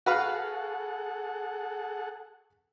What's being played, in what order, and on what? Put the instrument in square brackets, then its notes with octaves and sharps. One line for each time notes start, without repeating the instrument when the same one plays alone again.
[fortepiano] F#4 B4 F5 [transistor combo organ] G#4 A4 F#5